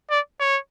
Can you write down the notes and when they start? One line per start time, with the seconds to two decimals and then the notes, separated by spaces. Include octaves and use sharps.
0.11 D5
0.40 C#5